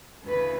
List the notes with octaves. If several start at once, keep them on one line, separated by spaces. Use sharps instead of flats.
D2 C#3 E3 B4